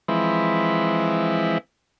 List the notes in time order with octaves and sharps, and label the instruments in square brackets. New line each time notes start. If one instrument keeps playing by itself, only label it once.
[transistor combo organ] E3 F3 G#3 C4 E4 B4